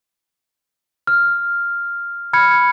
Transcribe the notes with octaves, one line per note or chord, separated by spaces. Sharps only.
F6
B5 F6 G#6 C#7